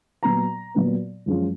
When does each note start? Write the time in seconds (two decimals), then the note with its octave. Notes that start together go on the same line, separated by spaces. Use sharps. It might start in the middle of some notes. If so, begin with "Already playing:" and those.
0.23 A#2 F#3 B3 A#5
0.74 A#2 F#3 B3
1.26 F#2 F3 G#3 C#4 F4